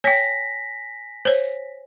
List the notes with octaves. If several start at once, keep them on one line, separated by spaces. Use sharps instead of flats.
C#5 G5 G#5 A#6 B6
C5 C#5